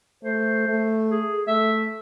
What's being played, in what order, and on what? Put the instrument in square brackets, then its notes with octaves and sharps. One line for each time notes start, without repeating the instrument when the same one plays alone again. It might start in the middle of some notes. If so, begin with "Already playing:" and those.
[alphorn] A3 [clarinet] C5
[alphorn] A3
[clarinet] G#4
[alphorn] A3 [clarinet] E5